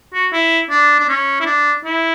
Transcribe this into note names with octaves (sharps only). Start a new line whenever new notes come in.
F#4
E4
D4
D4
C#4
E4
D4
E4